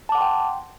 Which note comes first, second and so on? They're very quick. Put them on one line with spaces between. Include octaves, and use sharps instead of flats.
A5 D6 F#5 C6 G5